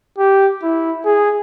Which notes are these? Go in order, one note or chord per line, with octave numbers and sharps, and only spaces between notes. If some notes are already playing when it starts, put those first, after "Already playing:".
G4
E4
G#4